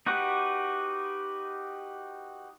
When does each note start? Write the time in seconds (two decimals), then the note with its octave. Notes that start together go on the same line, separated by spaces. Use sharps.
0.06 D#4 F#4 G4 B4 F#5